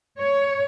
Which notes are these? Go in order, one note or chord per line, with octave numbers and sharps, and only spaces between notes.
C#5